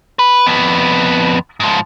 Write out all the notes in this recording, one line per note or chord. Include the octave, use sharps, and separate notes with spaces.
B4
F2 B3
G#2 F3